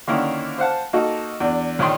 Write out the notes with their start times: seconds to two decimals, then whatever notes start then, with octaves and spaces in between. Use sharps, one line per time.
0.08 D3 D#3 A#3 C#4 E4
0.58 C5 F5 F#5 A5
0.93 A#3 D#4 F#4 A4
1.40 E2 D4
1.79 A#1 D#3 C#5 G5 C6